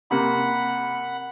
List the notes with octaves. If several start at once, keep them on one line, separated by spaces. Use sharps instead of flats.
C3 A#3 F#5 B5